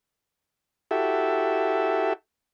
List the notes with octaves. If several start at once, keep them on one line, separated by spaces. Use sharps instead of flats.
E4 F#4 G4 A4 E5